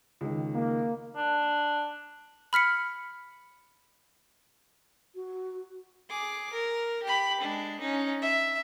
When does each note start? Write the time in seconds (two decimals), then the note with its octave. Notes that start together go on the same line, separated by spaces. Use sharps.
0.21 C#2 D#3
0.53 A#3
1.16 D4
2.53 B5 F6 B6 C#7
5.15 F#4
6.09 G#4 D6
6.53 A#4
7.03 G4 B5
7.41 G#3 D4
7.80 C#4 D#4
8.22 E5